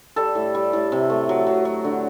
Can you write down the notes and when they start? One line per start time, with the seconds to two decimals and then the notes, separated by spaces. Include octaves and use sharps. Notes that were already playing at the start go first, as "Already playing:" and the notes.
0.16 G3 A4
0.35 A2
0.55 G3
0.73 A2
0.92 C3
1.10 A3
1.29 F#3
1.47 F#3
1.65 F#3
1.84 D3